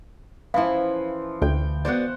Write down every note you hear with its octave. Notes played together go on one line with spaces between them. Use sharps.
E3 F3 C#4 E4 F5
D2 G5
B3 F#4 C5 D5 F#5